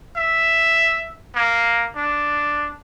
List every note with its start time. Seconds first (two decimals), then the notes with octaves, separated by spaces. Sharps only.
0.17 E5
1.35 A#3
1.96 D4